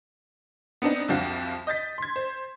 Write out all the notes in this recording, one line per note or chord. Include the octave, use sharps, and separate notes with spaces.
B3 C4 D4 D#4
C2 F2 F3 F#4 A5
D#5 G6 A6 B6
C6 G#6
C5